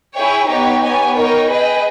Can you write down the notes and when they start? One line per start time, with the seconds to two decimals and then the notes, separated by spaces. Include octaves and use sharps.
0.15 E4 G#4 C#5 G5
0.47 B3 D#4 G4 C#5 G5
0.82 B3 G4 C#5 G#5
1.15 D#4 A#4 C#5 G5
1.49 G#4 B4 D#5 G5